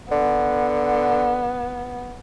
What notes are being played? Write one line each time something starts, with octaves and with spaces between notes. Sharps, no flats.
D3 B3